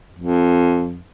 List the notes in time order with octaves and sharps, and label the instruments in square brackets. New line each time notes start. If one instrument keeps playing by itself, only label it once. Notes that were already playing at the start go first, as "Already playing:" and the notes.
[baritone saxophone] F2